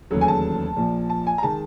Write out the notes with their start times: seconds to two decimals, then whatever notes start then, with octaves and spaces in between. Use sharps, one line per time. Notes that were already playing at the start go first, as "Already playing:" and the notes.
0.10 E1 D#2 C#3 F#3 A3
0.21 G#5
0.28 A5
0.77 A#1 A#2 F3
1.10 A5
1.27 G#5
1.38 A#5
1.43 D#3 G#3 A5